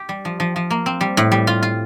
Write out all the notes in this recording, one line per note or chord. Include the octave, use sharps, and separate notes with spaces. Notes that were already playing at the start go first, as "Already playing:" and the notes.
Already playing: G4
G3
F3
F3
F3
A#3
C4
G3
A2
G3
F4
F4